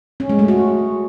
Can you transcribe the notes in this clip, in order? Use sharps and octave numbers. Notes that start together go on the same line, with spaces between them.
C#4
G#3
A3
F#4